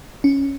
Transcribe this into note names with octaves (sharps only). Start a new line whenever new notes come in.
C#4